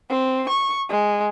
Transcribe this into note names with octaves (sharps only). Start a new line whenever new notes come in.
C4
C#6
G#3